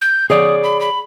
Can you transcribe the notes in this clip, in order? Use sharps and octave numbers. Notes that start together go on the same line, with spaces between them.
G6
G#4 C#5 D5 D#6
B5
B5